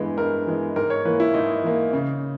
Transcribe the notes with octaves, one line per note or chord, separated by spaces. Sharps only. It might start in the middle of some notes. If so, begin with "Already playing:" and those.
Already playing: G2 E3 G#3 B3 B4
G2 A#4
E3 G#3 B3
G#2 A#4
C#5
E3 A#3 B4
E4
G#2 D#4
E3 A#3
C#3